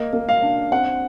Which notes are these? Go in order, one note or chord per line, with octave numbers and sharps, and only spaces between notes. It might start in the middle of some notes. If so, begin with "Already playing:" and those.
Already playing: A#3 D#5
A#3
F5
D4
C4 F#5